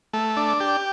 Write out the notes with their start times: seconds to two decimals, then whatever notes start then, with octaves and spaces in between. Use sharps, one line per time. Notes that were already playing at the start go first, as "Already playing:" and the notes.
0.13 A3
0.37 D4
0.60 G4